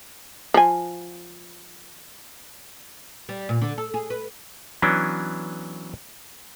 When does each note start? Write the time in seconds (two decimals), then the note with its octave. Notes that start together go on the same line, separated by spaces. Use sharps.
0.54 F3 G#5
3.29 G3
3.49 A#2
3.62 D3
3.78 A4
3.94 G#4
4.10 B4
4.82 E3 F#3 B3 C#4 D4